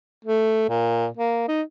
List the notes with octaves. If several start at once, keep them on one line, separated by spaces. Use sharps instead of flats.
A3
A#2
A#3
D#4